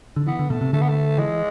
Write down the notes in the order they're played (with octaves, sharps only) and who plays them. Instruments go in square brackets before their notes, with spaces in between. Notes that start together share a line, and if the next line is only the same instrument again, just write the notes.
[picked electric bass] D3
[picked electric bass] E3 [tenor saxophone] B3
[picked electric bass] D3
[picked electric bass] B2 [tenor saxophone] A3
[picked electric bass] C3
[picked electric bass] D3 [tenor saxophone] A3
[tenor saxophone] B3
A3
[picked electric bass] E3 [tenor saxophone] G#3